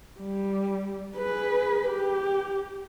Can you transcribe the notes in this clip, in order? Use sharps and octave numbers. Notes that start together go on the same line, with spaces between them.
G3
G#4 B4
G4